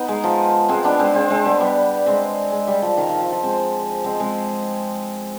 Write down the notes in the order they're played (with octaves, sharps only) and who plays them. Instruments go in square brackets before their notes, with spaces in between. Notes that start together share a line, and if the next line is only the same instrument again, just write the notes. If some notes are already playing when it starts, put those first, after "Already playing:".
Already playing: [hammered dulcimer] B3 D#4
G#3
F3
G#3 C4
B3 D4
G#3 C4
G#3 C4
G#3 C4
G3 B3
G3 B3
G#3 C4
G#3
G3
F3
D#3
F3
F3
F3
G#3 C4
G#3 C4
G#3 C4